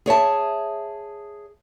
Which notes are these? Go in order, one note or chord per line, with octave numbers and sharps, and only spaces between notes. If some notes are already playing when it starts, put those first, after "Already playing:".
G#4 C#5 E5 A5